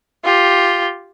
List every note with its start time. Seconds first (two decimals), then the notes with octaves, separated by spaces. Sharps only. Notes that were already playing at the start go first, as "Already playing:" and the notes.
0.24 F4 G4